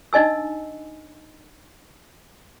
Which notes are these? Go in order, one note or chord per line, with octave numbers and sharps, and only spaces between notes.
D4 D#4 D#5 G#5 E6